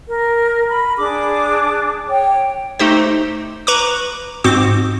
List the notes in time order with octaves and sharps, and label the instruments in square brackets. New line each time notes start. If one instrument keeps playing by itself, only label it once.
[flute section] A#4
B5
D4 G#4 D6
C#5 G5
[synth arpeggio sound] A3 D#4 G4 C5
B4 A#5 C#6 D6
G#2 C4 F#4 D6